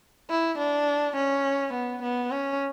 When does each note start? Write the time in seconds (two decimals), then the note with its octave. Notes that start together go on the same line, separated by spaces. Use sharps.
0.30 E4
0.58 D4
1.16 C#4
1.74 B3
2.03 B3
2.31 C#4